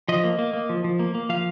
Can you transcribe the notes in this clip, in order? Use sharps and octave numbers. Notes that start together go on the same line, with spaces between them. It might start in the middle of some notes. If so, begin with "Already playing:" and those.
F3 D#5
A#3
A#3
A#3
F3
F3
A#3
A#3
F3 F5